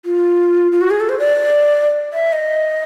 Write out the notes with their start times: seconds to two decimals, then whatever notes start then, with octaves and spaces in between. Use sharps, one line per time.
0.05 F4
0.72 F4
0.81 F#4
0.90 G#4
1.00 A4
1.09 C5
1.19 D5
2.13 E5
2.33 D#5